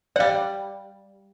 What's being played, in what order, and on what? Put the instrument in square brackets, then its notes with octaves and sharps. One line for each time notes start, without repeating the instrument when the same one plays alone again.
[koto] G3 F#5 [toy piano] D5 F5